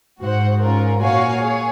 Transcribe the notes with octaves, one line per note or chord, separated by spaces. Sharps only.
G#2 F#4 C5 F#5
C#4 F4 A#4
A#2 F#4 C#5 F5 G#5
G#4 C#5